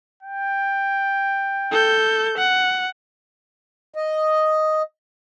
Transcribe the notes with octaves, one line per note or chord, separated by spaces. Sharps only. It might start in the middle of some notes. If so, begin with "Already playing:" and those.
G5
A4 G6
F#5
D#5